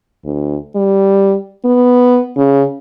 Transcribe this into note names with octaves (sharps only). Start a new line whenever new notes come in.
D2
G3
B3
C#3